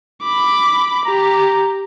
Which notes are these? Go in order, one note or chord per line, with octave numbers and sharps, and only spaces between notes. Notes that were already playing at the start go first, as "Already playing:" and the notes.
B5 D6
G4 A#5